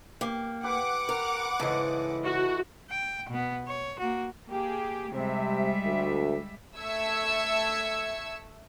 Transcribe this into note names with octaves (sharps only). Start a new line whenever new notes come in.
A#3 G4
G4 B4 F#5 D6
A#4
G#2 C#3 E3 A4 D#5
F#4
G5
B2 B3
C#5
A#3 F#4
A#3 G4 G#4
C3 G3 G#3 E5
D2
A3 E5 E6 G#6 C#7